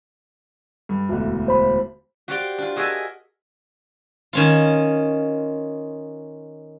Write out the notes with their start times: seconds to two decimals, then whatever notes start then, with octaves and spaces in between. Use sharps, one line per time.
0.89 G2
1.09 E1 D2
1.48 C5 B5
2.28 F#4 G4 C5 D5 F5 G5
2.58 D4 F4
2.76 F#4 G#4 A#4 D#5 E5 A5
4.33 D#3 C#4 F4